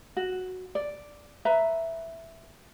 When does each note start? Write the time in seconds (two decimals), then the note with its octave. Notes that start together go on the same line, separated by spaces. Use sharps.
0.17 F#4
0.75 D5
1.45 B4 E5 A#5